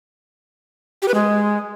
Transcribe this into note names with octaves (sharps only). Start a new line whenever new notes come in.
G4
B4
G#3